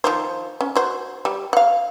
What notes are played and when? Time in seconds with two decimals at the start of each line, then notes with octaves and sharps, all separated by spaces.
0.04 D#3 F3 C5
0.61 C#4
0.76 F#4 C5
1.25 G3
1.53 F5 F#5